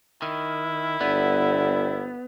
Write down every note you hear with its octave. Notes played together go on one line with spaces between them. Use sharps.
D#3 E4
G1 D3 B3